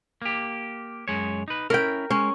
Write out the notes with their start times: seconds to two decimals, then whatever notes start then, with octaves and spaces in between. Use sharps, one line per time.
0.22 A#3 G4
1.08 F#2 G#3 C#5
1.48 D#4 B4
1.70 C#4 E4 A#4 G5
2.10 G#3 C#4